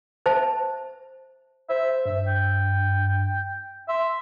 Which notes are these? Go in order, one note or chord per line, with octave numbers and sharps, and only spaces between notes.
C5 E5 A5
C5 E5
G2 E5
G5
E5 C6